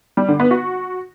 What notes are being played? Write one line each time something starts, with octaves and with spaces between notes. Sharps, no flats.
G3
D3
B3
F#4